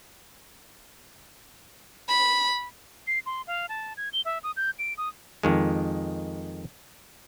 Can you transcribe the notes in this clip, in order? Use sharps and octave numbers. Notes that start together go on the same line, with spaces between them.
B5
C7
C6
F5
A5
G#6
G7
E5
D#6
G6
D7
D#6
F2 D#3 G#3